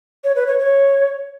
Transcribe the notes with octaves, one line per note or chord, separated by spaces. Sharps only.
C#5
B4
C#5
C#5